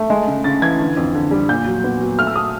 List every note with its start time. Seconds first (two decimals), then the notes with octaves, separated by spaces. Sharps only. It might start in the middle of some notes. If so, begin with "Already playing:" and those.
Already playing: A3
0.10 G#3
0.27 C#3
0.44 C#3 A6
0.62 E3 G#6
0.79 D3
0.97 F2
1.15 D3
1.31 G3
1.49 A#2 G6
1.66 F#3
1.84 B3
2.01 F#3
2.19 A3 F6
2.27 E6
2.36 A3 D#6